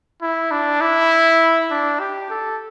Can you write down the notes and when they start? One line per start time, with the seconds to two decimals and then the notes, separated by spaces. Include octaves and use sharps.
0.22 E4
0.51 D4
0.81 E4
1.71 D4
2.00 G4
2.30 A4